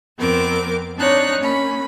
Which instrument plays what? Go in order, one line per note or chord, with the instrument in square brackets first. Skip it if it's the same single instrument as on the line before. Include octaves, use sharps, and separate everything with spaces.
[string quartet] F2 B3 C4 A#4 D6
C4 D4 D#4 C#5 F#6
A#3 C#4 B5